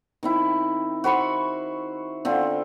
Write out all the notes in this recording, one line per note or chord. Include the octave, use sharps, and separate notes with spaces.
D#3 C4 E4
F#4 C5 B5 C#6
D3 C4 F4